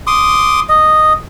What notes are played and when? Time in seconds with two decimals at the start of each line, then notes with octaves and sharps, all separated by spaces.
0.07 C6 D6 D#6
0.69 D#5